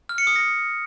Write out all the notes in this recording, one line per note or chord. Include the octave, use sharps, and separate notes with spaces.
F6
C#7
D#6
A#6